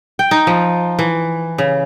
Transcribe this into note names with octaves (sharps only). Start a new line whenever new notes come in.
G5
D#4
F3
E3
C#3